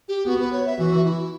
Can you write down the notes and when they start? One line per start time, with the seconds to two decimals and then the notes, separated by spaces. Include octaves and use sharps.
0.08 G4
0.26 B3 F#4
0.40 B4
0.53 C#5
0.66 E5
0.79 E3 F#4
1.06 E4